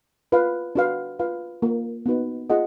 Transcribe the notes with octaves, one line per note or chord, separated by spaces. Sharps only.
F4 B4 F5
D4 F#4 B4 F5
F4 B4 F5
A#3 F4 A#4
B3 D#4 F#4 B4
F4 G#4 D#5 F#5